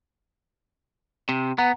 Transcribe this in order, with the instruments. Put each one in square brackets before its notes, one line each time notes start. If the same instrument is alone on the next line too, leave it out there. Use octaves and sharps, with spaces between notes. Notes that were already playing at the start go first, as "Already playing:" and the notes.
[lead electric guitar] C3
[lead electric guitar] B3 [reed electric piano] F#5 A#5